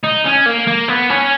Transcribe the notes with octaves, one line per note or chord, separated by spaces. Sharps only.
D#4
C#4
A#3
A#3
B3
C#4